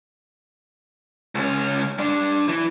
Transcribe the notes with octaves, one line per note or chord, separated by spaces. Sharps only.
C#2 C#4
G2 D4
E3